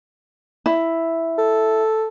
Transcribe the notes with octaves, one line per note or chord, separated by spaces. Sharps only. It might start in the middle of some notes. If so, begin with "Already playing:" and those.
E4
A4